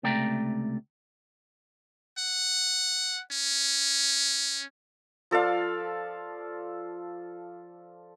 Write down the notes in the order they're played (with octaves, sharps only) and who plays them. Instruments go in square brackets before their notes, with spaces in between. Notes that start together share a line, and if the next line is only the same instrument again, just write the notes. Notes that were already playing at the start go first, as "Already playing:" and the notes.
[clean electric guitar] C#2 C3 A3 D5 G5 A#5
[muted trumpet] F#5
C#4
[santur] F3 A4 D5 F5